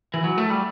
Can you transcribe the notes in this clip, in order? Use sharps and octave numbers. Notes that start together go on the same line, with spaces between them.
E3
F#3
A3
G3